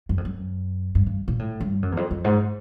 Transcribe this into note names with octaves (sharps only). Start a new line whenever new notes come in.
F#2
F2
F#2
G2
G2
A#2
A2
G2
F#2
E2
F2
F2
G#2